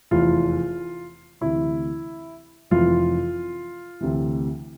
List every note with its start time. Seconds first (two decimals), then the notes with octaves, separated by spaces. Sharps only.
0.11 F1 E2 E3 F4
1.41 D2 C3 E3 E4
2.71 F1 F2 E3 F4
4.01 D2 C3 E3